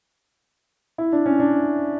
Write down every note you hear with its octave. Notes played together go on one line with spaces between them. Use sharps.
E4
D4
C#4
D4